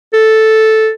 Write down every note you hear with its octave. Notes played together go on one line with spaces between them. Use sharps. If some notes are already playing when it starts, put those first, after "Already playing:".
A4